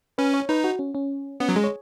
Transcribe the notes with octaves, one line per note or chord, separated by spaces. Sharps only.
C#4 B4
C#5
D#4 B4
F#4
C#4
C#4
B3 C#4
F#3
G#3 G#4
C#5